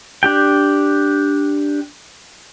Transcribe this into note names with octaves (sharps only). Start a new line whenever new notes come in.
D4 G4 G5